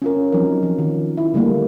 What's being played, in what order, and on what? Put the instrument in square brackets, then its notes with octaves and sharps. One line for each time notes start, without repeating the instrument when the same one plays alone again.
[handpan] C#4 F4 A#4
F3 F#3 C4 D#4 A#4
F3
D#3
E4
D3 G3 A3 A#3